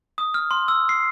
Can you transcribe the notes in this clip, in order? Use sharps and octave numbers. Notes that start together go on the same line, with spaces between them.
D#6
F6
C6
E6
C7